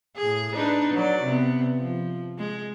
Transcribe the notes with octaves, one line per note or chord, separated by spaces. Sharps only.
A2 G#4
D4 D#4 B4
F#3 D5
C3 B3
F3
G#3